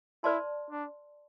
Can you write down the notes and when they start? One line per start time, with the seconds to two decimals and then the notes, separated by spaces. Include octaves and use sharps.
0.24 E4 B4 D5 A5 C6
0.71 D4